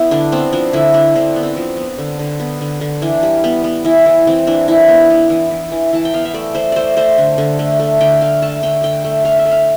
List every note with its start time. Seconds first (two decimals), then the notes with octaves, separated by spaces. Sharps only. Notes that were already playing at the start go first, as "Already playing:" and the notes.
Already playing: B3 E4
0.11 D3 D4
0.32 B3 C4
0.53 F3 D4
0.73 D3 E4
0.94 D3 D4
1.15 D3 C4
1.36 B3
1.43 C4
1.57 F3
1.77 B3
1.98 D3
2.19 D3
2.40 B3
2.61 D3
2.81 D3
3.02 E3 D4
3.23 G3
3.44 B3
3.64 B3
3.85 E3 E4
4.06 E3
4.27 E3 C4
4.47 E3 D4
4.68 E3 E4
4.88 B3
5.10 B3
5.30 E3
5.51 E3
5.72 E3
5.93 E3 A5
6.05 G5
6.13 B3 F5
6.25 E5
6.34 A3 D5
6.55 A3 C5
6.72 A3 C5 D5
6.97 A3 C5
7.18 D3
7.38 D3
7.59 A3
7.80 A3
8.01 D3 G5
8.21 A3 F5
8.42 A3 A5
8.63 D3 G5
8.83 D3 G5
9.04 A3
9.25 A3 F5
9.39 E5
9.45 A3
9.51 F5